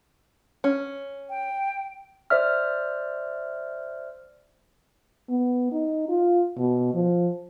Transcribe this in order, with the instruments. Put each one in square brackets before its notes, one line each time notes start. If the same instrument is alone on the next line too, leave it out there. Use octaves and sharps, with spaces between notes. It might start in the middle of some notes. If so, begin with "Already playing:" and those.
[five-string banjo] C#4
[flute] G5
[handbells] C5 D5 E5 F6
[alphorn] B3
D#4
F4
B2
F3